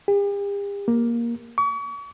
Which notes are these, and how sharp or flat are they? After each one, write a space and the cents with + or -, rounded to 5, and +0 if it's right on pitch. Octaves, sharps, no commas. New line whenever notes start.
G4 +45
A#3 +10
C#6 +40